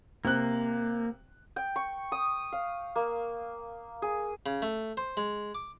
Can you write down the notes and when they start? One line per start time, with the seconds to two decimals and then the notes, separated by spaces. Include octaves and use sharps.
0.25 C3 A#3 F#6
1.56 G5
1.76 C#6
2.12 D#6
2.52 F5
2.96 A#3
4.02 G#4
4.46 C#3
4.62 A3
4.97 C5
5.17 G#3
5.55 D6